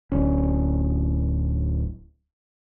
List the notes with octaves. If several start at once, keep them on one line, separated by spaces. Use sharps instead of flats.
D1 C#4